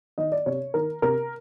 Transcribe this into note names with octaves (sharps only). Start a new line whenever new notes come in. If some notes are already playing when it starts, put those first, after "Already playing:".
D#3 D#5
D5
C3 C#5
D#3 A#4
C3 A#4